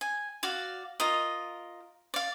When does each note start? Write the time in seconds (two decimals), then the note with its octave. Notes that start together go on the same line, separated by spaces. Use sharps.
0.01 G#5
0.43 F#4 D5 F5
1.00 F4 A#4 D#5
2.14 D5 F5